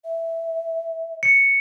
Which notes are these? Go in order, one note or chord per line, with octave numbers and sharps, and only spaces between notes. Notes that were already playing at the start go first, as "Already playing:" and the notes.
E5
C#7